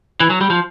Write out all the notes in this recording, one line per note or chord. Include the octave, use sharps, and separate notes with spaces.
E3
F#3
G3
F3